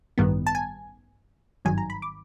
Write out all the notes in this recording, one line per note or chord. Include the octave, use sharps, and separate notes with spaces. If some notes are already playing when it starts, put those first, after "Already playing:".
A1 G2 D#3 G3 B3
A5
G#5
G#1 G2 D#3 F#3 G#5
A#5
B5
D6